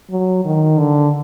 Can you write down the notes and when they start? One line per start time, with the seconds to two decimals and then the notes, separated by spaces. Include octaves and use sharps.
0.10 F#3
0.45 D#3
0.79 D3